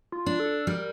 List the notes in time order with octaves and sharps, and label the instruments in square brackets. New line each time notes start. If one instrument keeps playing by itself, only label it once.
[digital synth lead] F4
[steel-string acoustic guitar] D4
[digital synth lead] A4
[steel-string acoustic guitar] G3 [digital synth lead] A#4